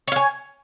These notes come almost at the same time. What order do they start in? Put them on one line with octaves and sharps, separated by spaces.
C#5 F5 G#5